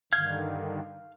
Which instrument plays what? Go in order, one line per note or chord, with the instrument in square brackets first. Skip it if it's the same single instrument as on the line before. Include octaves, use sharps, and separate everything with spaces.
[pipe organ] G2 D3 D#3 [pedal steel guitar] F5 F6 G6 [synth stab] G#6